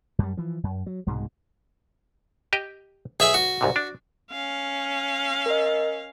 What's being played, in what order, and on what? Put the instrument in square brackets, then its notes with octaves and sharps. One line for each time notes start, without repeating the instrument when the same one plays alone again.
[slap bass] F#2 G3
E3 F3
F#2
F#3
C2 G#2 B2 G#3
[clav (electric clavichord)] G4 D#5 G5
[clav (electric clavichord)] B1 [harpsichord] G#4 E5 G#5
[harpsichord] F#4
[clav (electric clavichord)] C2 G#2 C3
D4
[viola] C#4 F5
[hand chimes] A#4 D#5